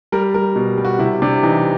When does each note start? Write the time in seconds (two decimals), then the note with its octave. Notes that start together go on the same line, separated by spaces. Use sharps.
0.12 G3 A#4
0.34 G3 A#4
0.56 B2
0.78 G3
0.85 F#4
0.99 C3 E4
1.22 C3 D4
1.43 E3 D#4